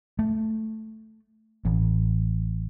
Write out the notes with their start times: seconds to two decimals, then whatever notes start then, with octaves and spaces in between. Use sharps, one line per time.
0.19 A3
1.65 A1